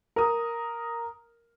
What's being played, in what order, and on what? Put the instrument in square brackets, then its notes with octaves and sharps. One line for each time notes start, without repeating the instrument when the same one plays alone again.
[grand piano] A#4 D#6